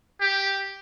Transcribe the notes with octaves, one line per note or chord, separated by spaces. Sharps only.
G4